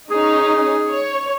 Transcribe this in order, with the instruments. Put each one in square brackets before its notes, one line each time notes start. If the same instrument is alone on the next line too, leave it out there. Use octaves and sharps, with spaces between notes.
[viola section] C#4 D#4 [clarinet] G#4
[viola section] C#5